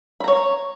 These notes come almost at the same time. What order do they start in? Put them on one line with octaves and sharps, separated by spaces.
B5 A#5 C#5